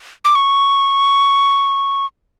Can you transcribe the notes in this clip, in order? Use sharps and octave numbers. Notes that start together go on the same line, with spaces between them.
D6
C#6